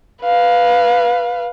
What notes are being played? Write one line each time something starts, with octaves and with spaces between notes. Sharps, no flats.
B4 F5